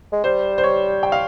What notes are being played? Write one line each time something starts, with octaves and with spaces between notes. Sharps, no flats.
G#3
G3 C5
C5
C#5
G5
F5